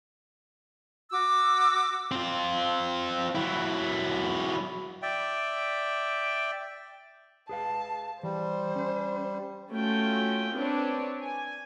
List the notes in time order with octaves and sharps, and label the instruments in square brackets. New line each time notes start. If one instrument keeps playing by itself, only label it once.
[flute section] F#4 D6 E6
[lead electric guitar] C4 F4
F#3 E4
[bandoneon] D5 E5 G5
[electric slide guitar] G#4 B4 F5 [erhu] A5
[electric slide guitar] E3 [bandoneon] G3 [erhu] C5
[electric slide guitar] C#4
[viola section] A3 C#4 F4 F#4 G5
C4 D4 B4 C#5
G#5